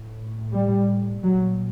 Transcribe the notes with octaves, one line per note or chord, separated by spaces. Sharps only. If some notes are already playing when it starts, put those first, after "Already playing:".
Already playing: A2
G3
A#2 F#3